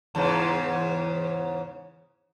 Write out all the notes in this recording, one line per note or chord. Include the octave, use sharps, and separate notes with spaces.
E2 G#2 C#3